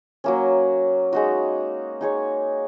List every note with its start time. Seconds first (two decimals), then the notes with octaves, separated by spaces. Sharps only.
0.24 F#3 A#3 C#4
1.13 G#3 D#4 F#4
2.01 D#4 G#4 C#5